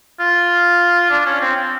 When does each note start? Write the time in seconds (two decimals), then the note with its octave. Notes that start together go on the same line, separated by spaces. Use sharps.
0.20 F4
1.11 D4
1.26 C#4
1.41 C4
1.57 C4